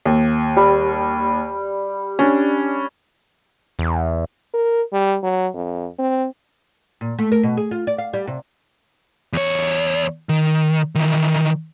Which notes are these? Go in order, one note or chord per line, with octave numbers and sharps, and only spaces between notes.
D#2
G3
C#4 D4
E2
A#4
G3
F#3
F2
C4
A#2
A3
A#4
B2
G#4
F4
D5
F5
G3
C3
E2 C#5
D#3
D#3 E3